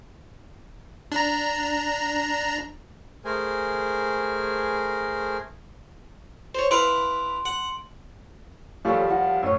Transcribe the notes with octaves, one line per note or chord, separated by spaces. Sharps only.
D4 A#5
A3 G#4 A#4 C5 G#5
C5 C#5
E4 B4 F5 C6 D7
F#5
D#2 F3 G3 A4 C#5 G#5
F#4 F#5 A5
F#2 A2 C#5 E5